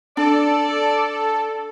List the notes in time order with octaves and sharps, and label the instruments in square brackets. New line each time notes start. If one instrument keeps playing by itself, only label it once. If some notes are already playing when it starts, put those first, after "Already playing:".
[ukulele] D4 [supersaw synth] A4 [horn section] D5